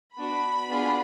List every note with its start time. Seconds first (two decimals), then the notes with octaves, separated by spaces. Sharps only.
0.18 B3 D4 F#4 B5
0.69 B3 D4 F4 G#4